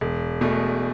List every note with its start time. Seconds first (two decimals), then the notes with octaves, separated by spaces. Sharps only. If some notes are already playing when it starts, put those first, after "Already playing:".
0.01 E1
0.41 E2 B2 A3